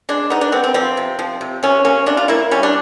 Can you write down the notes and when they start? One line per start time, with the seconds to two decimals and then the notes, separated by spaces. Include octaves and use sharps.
0.09 G#3 D4
0.30 B3 D#4
0.41 D4
0.52 B3 C4
0.64 C4
0.74 F3 C4
0.97 C3
1.19 F3
1.41 C3
1.63 C3 C#4
1.85 A#3 C#4
2.06 C3 D4
2.17 F4
2.28 A#3 E4
2.51 G3 C#4
2.63 D4